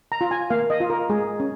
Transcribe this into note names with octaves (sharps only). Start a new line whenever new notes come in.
A#5
F4
G#5
A#3 F5
D#5
F4
A#4
G#3 G#4
C#4